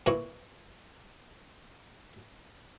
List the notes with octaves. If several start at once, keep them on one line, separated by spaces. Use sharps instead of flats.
A#2 E3 B4 C#6